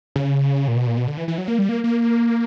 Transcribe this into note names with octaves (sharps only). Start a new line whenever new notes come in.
C#3
A#2
B2
A#2
B2
D3
E3
E3
F#3
A#3
G3
A#3
A#3